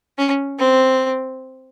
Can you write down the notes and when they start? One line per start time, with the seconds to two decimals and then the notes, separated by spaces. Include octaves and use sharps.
0.18 C#4
0.59 C4